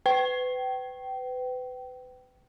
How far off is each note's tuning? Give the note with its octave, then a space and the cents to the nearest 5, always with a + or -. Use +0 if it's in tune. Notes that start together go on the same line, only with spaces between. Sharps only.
B4 +30 G5 -25